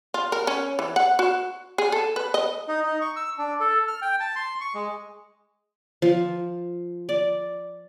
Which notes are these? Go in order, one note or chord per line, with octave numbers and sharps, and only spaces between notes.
F4
A#4
C#4
E3
F#5
F#4
G#4
A4
B4
D#5
D#4
D#4
C#6
E6
D4
A4
F6
G5
A5
C6
C#6
G#3
F3
D5